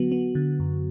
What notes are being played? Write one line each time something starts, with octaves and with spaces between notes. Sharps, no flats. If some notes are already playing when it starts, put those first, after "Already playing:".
Already playing: D3 F#3 B3 F#4
B3
D3
F#2